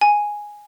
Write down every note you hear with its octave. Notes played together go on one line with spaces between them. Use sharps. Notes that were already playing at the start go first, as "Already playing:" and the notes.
G#5